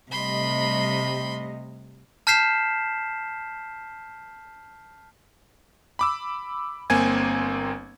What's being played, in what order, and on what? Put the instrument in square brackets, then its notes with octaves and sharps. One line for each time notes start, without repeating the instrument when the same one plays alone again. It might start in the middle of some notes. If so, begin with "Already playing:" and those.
[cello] C3 [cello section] G3 A3 D#5 [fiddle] B5 C6
[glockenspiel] A5 F6 G6 B6 C7 E7
[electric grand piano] B5 D6 E6
G1 A#3 C4 G#5 G#6